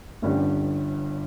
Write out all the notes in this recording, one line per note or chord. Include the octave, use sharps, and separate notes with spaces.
G1 G2 D3 G3 C#4